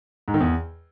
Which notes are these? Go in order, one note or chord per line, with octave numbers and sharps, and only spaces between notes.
G#2
D#3
E2